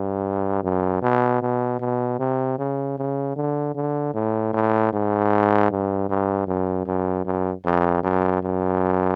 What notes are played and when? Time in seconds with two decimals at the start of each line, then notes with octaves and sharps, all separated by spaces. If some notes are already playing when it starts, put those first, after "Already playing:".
Already playing: G2
0.64 F#2
1.02 B2
1.42 B2
1.80 B2
2.19 C3
2.59 C#3
2.98 C#3
3.36 D3
3.75 D3
4.14 A2
4.53 A2
4.93 G#2
5.71 G2
6.09 G2
6.48 F#2
6.87 F#2
7.25 F#2
7.65 F2
8.03 F#2
8.43 F#2